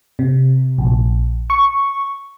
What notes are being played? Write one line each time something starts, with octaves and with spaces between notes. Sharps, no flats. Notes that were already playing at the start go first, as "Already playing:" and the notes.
C3
A#1
C#6